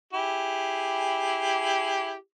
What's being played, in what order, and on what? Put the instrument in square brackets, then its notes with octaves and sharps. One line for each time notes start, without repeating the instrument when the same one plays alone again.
[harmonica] E4 G4 G#4